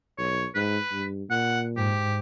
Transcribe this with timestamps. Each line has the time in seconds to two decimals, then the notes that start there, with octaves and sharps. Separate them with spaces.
0.18 B1 C#5
0.55 G#2 B4
0.92 G2
1.30 A#2 F#5
1.77 G#2 G4